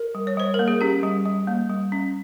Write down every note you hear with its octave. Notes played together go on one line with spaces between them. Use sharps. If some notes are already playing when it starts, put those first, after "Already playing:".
Already playing: A#4
G3
C#5
G3 C5
A#4
A#3
G#4
C#4 G4
G3
G3
A#3
G3
C#4